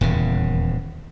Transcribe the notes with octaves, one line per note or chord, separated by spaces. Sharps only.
D#1 E2 C#3